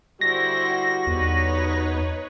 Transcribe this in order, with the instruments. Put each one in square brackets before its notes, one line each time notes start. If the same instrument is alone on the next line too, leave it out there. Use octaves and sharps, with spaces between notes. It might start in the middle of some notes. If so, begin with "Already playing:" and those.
[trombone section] D3 G3 F#4 [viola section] E4 G4 C5 [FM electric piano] A#6
[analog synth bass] E2 [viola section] D#4 B4 C#5